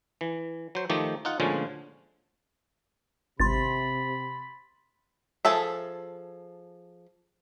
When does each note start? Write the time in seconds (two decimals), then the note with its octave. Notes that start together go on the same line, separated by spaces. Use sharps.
0.21 E3
0.75 F#3 C5
0.90 D#3 F3 A3 D#4 G4
1.25 D#4 F4 F#5
1.40 D2 A#2 D3 F3 G#3 C#4
3.40 G#1 C3 B5 C6 A6
5.45 F3 G#4 A4 E5